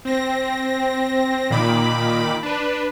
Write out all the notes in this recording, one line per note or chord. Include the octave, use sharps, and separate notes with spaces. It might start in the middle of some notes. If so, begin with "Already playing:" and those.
C4 A#6
A#2 D#3 B5 D6
D4 B4